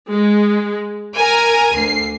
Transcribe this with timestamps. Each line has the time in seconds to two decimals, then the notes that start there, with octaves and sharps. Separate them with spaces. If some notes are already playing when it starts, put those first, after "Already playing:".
0.11 G#3
1.16 A#4 G#5 A#5
1.74 D2 C7